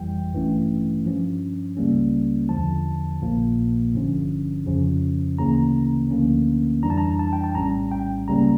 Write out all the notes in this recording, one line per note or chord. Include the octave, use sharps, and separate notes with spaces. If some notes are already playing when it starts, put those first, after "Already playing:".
Already playing: G1 F2 E3 G3 G5
A1 G2 E3 A3 C#4
G2 F3 C#4
C#2 C#3 G3 A#3 C#4
E2 D3 F3 A5
A#1 A#2 F3 A#3
G1 G2 D3 F3 C#4
F2 C#3 F3 C#4
D2 C#3 E3 A#3 C#4 A#5
D2 D3 F3 A#3 C#4
F2 E3 G3 D4 A#5
A5
A#5
A5
G5
A5
A#1 A2 G3 C#4 A#5
G5
C#2 C#3 G3 A#3 C#4 A#5